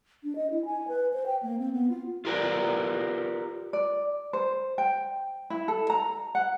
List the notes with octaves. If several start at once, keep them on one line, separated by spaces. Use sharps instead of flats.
D4
D#5
E4
G#5
B4
C5
G5
A#3
C4
B3
F4
F4 G4 A#4 B4 D5
D5
C5
G5
E4
A4
A#5
F#5